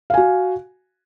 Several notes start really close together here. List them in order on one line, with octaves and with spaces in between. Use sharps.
F5 G#5 F#4